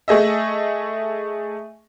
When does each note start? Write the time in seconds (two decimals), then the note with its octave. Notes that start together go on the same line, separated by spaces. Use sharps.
0.08 A3 G#4 D#5 E5